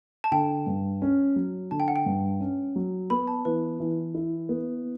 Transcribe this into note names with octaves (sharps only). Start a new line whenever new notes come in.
A5
D3 G5
G2
C#4
F#3
D3 A5
G5
F#5
G5
G2
C#4
F#3
B3 B5
A5
E3 B4
E3
E4
B3